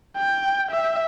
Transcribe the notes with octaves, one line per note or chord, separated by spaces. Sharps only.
G5
E5